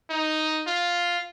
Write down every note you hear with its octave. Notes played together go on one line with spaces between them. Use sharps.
D#4
F4